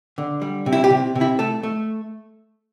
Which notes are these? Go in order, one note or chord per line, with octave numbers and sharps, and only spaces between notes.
D3
G3
C3
E4
G4
C3
C3
E4
A3 A4
A3